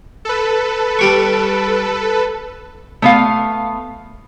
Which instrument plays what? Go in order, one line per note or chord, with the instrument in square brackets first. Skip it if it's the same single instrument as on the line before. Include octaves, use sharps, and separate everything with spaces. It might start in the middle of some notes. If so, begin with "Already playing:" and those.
[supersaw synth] A4 B4
[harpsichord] G3 G4 C#6
[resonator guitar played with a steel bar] A3 B3 F5